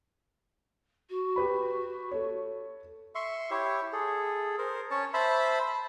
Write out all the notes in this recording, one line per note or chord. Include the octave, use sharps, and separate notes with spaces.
F#4
G4 B4 B5
A4 C#5
E5 C6 C#6
E4 G4 C#5 E5
G#4 A4
A#4 C5
C#4 C#5 A5
C5 E5 A5 B5